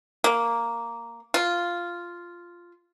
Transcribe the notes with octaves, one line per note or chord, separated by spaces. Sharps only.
A#3
F4